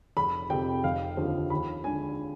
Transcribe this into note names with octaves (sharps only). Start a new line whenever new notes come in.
F1 B5
F2 C3 G5
F1 F5
D#2 D3 F3
D#2 B5
D3 G#3 D4 G#5